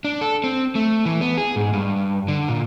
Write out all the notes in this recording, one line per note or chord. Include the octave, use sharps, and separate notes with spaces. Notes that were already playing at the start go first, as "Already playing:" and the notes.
D4
A4
C4
A3
E3
B3
G#4
G#2
G2
D3
A#2